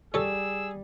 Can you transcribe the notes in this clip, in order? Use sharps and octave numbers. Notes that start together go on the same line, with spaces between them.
G3 G#4 A4 C#5 E6